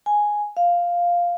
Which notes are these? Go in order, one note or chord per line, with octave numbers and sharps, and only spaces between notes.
G#5
F5